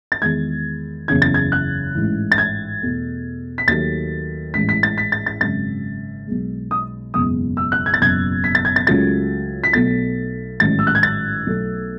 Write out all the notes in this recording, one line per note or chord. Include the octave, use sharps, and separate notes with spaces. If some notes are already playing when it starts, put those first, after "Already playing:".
A6
E2 D#3 G#3 G#6
F#1 E2 C#3 E3 G#6
A6
G#6
F#6
A1 G#2 E3
A6
G#6
E2 B2 A3
B6
D#2 D#3 F#3 A3 A6
A1 G#2 E3 G#3 B6
B6
A6
B6
A6
A6
G#1 F#2 C#3 A6
B1 B2 G#3
D#6
F#1 E2 B2 G#3 D#6
E6
F#6
G#6
A6
F#1 E2 B2 G#6
B6
A6
G#6
A6
C#2 C#3 F#3 A3 A6
B6
B1 B2 A3 A6
A1 G#2 D#3 F#3 A6
E6
F#6
G#6
A6
B1 B2 A3